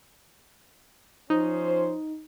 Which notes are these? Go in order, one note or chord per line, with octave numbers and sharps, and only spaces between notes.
F3 C#4 D#4 C5